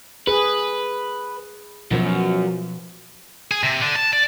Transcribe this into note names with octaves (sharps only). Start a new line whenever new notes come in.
G#4 B4
F#2 B2 F3
G#4
C3
D3
A5
D5